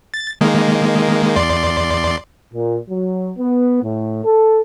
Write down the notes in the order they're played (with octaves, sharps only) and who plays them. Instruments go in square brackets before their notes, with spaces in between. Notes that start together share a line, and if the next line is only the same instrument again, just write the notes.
[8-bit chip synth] A6
D#3 G#3 A#3
E2 D5 C6
[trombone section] A#2
F#3
B3
A2
A4